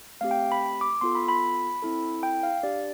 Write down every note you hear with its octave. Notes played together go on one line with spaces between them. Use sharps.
A3 C4 G4 F5
G5
B5
D6
B3 F4 A4 C6
B5
B5
C4 E4 A4
G5
F5
D4 G4 D5